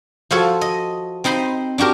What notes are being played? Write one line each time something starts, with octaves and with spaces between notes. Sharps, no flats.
F3 F4 F#4 A4 C#5
D#5
C4 D#4 C5 B5 C6
D4 F#4 G4 A#4